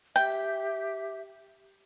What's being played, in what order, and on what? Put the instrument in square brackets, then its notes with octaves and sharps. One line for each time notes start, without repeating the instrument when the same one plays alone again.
[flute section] G4 E5 [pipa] G5 [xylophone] G6